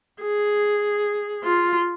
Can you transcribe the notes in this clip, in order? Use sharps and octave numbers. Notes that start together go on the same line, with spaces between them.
G#4
F4